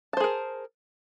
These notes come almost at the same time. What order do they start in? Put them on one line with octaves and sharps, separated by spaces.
A5 C5 G#4 A#4